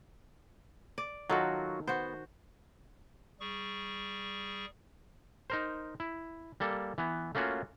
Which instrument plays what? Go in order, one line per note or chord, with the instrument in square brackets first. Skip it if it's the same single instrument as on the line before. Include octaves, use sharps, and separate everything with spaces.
[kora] D5
[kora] D#3 A4 [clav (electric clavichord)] F#3 F4 F#4
[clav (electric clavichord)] B3 [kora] F#4 C5
[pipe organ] G3 G#4 C#6
[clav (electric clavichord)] D#4 A#4 C5
E4
G3 A#3 A4
E3 B3
A3 A#3 C#4 F4 F#4